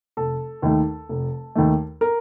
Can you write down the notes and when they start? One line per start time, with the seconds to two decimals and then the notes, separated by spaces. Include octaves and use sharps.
0.17 F1 A4
0.62 D#2 D#3 A3
1.09 F1
1.56 D#2 D#3 A3
2.01 A#4